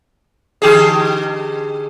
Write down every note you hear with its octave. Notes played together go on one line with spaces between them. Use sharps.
D3 G4 G#4